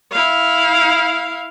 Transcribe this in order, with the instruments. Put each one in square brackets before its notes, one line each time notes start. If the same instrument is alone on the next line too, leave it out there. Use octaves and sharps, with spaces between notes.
[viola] E4 F5